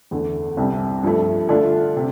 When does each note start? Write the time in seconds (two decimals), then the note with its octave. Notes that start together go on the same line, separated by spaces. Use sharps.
0.11 E2 D3 A3
0.57 C2 C3 G3
1.03 G2 F3 A3
1.49 D3 A3 D4 F4
1.97 C3